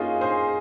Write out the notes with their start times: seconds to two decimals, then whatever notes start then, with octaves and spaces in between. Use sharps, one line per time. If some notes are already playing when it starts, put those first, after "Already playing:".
Already playing: A#3 C#4 D#4 F4 F#4 G#4
0.21 G#4 C5